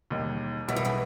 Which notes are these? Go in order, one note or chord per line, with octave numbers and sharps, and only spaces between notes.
E1 D#2 D#3 G3
B1 B2 E3 G3 B3 E4
D#3
C#3 E3